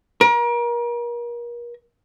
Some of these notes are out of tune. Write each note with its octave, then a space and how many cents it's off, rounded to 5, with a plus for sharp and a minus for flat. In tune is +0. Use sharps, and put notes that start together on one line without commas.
A#4 +35